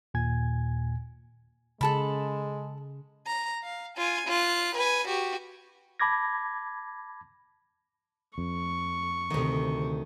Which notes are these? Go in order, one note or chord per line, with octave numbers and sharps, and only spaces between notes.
D#2 A#2 G#5 G#6
C#3 G#3 G#4 A4 A5 B5
A#5
F5
F4 G#5
F4 F#6
B4 G#5
F#4 G4
A5 B5 D6 G#6 A#6
F2 C#6
D2 C3 D#3